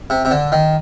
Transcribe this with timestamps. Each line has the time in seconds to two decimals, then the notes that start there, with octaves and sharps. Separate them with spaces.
0.10 C3
0.25 C3
0.31 D3
0.52 D#3